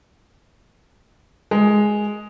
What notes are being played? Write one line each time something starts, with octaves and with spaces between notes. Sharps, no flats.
G#3